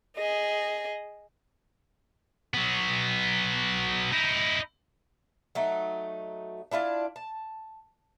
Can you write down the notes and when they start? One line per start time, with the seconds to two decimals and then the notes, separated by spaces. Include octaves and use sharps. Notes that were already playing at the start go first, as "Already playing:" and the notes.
0.16 G#4 D#5
2.54 F#3 B3
4.12 D#4 E4
5.55 F#3 A3 D#4
6.72 D4 E4 F4 D5
7.16 A5